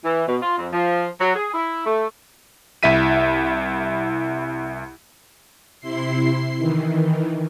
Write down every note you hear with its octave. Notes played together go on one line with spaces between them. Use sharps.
E3
B2
F4
F2
F3
F#3
G#4
E4
A3
C2 E4 E5 B6 D#7
C3 E4 C6 C7
D#3 E3